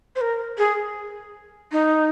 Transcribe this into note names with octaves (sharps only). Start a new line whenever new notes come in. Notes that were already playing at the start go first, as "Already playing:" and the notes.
C5
A#4
G#4
D#4